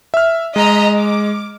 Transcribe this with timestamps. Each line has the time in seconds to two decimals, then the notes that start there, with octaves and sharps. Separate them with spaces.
0.14 E5 F6
0.56 G#3 D#5 A#5 B6
0.96 D6